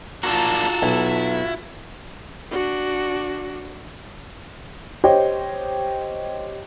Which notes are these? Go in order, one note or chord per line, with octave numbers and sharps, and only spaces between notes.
A#3 D4 F4 F#4 A5 A#5 E6
B1 E4
D4 F#4
G4 C5 C#5 D#5 G5